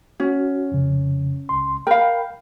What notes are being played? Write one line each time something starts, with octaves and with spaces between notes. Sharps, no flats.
C#4 F#4
F2 C#3
C#2 C6
A#4 F5 G5 B5